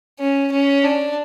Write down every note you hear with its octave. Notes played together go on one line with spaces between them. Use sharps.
C#4
C#4
D4